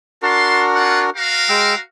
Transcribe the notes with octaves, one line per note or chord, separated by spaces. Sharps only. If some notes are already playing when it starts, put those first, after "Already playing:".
D4 F#4 A#4 A5 C6
C4 F4 F#5
F#4 A#4 F5
G#3 G5 E6